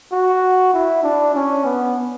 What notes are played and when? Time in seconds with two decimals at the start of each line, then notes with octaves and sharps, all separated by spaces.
0.12 F#4
0.73 E4
1.03 D4
1.34 C#4
1.65 B3